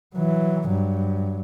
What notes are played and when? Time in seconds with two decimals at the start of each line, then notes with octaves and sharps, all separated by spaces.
0.15 E3 F#3
0.68 G2 F#3